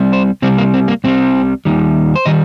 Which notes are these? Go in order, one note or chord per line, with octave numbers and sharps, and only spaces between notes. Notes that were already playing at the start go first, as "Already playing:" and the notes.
Already playing: C2 C3 G3
C5
C2 C3 G3 C4
A#3
C4
A#3
C2 C3 G3 C4
D#2 D#3 G3
C5
D#3 G3 D#5